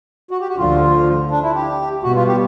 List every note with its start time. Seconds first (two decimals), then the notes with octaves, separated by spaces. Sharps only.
0.31 F#4
0.41 G4
0.49 F#4
0.58 D2 D3 F3 F4
1.31 D4
1.43 E4
1.55 G4
2.04 B2 G3 B3 F#4
2.15 F4
2.28 G4